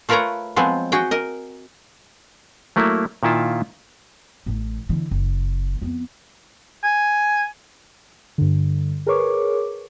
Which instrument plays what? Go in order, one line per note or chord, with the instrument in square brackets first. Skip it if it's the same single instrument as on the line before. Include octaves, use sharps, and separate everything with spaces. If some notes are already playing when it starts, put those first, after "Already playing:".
[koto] A3 F4 A#4 B4 C#5 A#5
F3 F#3 G#3 B3 C4
F#4 G#4 G5
A#4 D#5
[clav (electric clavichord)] F#3 A3 A#3 E4
A#2 D#3 E4 F4 A5
[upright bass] A1 A2
D3 E3
F#1
F2 B3
[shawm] G#5
[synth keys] G2 D3
G#4 A#4 B4 C#5 C#6 D6